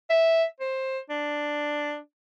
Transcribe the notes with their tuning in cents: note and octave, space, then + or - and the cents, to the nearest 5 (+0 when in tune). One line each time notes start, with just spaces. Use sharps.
E5 -5
C5 +15
D4 +5